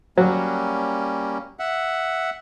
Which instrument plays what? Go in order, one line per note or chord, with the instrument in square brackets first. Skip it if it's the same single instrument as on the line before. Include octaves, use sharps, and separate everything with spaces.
[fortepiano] F#3 [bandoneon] G3 A#3 C#4
[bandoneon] E5 F#5